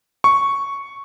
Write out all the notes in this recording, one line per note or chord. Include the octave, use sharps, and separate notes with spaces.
C#6